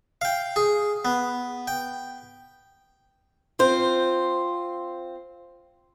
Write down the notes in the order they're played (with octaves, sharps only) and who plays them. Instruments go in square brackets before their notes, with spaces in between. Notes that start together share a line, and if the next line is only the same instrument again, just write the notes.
[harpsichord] F5 G5
G#4
B3
G5
[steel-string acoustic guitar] C4 F4 C5